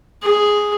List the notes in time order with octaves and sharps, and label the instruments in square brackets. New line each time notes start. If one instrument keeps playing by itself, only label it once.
[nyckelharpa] G#4